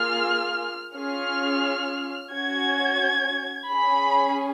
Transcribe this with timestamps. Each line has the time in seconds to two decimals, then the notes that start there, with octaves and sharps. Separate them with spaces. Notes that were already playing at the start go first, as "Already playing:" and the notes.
Already playing: A#3 F4 G#4 F6
0.94 C#4 F4 G#4 F6
2.32 C#4 F#4 G#6
3.71 C#4 G#4 B5